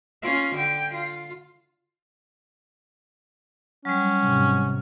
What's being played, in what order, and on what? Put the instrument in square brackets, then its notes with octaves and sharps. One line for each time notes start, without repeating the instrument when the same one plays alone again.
[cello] C#4 F4
D3 G5
F4
[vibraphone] F#3 G3 [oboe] C#4
[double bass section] G#1 G#2 C3